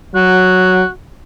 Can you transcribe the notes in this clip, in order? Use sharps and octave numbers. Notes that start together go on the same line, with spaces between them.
F#3 F#4